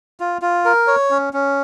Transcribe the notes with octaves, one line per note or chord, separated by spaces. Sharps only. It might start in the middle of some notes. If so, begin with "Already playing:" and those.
F4
F4
A#4
C#5
C#4
C#4